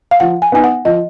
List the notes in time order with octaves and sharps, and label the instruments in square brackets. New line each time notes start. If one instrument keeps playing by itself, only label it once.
[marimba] F5
[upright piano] F3 [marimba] F#5
[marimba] G#5
[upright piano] B3 D#4 [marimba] G#5
[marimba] F#5
[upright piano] F3 [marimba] D#5